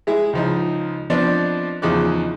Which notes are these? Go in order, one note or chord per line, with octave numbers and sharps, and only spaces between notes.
G#3 E4 G#4
C#2 F3 D#4
F3 B3 C4 D4 D5 D#5
E2 C#3 F3 D#4 D6 F#6